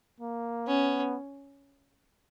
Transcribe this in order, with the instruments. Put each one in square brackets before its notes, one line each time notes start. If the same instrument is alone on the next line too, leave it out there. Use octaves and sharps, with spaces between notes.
[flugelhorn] A#3
[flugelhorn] B3 [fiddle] C#4